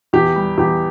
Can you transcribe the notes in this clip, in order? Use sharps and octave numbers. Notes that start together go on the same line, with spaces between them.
E2 G4
G3
E2 G4